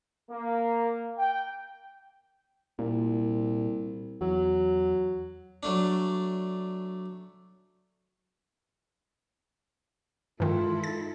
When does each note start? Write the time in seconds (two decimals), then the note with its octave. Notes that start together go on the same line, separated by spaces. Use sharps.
0.31 A#3
1.18 G5
2.79 C2 A#2
4.21 E2 F#3
5.63 F#3 A3 D4
10.40 G2 D#3 G#3 E4 F4 A4
10.84 D#4 A6